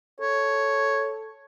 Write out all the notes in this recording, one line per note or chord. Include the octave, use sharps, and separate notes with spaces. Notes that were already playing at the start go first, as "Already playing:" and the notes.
A4 C#5